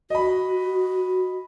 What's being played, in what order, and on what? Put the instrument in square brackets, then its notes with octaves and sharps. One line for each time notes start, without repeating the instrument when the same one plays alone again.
[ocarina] F#4 [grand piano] D#5 B5